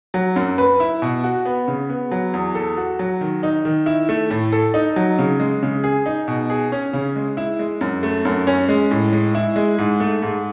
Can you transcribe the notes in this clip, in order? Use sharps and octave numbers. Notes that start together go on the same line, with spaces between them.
F#3
F#2
B4
E4
B2
F#4
B3
C#3
B3
F#3
E2
A4
F#4
F#3
D#3
D#4
D#3
E4
A3
A2
A4
D#4
F#3
C#3
G#3
C#3
G#4
D#4
B2
G#4
C#4
C#3
G#3
E4
G#3
F#2
A3
F#2
C#4
G#3
A2
G#3
E4
G#3
G#2
A3
G#2